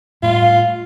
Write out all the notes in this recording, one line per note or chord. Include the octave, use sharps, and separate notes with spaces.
A2 G3 F4